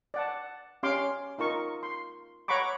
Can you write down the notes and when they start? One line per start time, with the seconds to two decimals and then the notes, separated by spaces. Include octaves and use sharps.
0.14 D5 F#5 A5
0.83 C#4 G4 F5 C6 D6
1.38 D#4 F4 A#4 C#6
1.83 C6
2.48 C#5 F#5 A#5 B5 C#6 D6